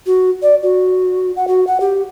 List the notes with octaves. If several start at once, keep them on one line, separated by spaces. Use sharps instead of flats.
F#4
D5
F#4
F#5
F#4
F#5
G4